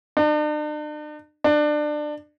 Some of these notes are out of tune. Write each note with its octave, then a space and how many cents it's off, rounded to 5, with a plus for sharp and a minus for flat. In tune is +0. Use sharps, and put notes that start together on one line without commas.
D4 +45
D4 +25